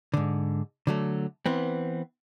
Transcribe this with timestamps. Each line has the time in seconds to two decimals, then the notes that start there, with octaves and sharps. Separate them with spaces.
0.14 G#2 D3
0.87 D3 F#3 A3
1.46 E3 B3 C4